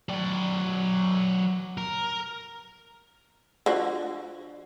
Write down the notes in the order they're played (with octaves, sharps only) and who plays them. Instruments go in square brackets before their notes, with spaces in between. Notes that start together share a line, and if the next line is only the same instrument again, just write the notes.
[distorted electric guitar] F#3 D5
A#4
[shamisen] D3 F3 F#4